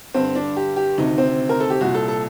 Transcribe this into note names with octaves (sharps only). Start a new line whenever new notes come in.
G2 D3 C4
D4
G4
G4
D2 C3 D#3 D#4
C4
A#4
A4
G4
C2 A#2 F#4
A4
A4